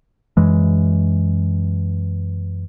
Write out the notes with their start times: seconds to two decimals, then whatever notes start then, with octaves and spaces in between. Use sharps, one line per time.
0.37 F#2 E3 G#3